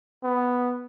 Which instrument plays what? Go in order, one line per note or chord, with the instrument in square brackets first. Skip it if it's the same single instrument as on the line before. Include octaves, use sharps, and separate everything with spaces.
[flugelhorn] B3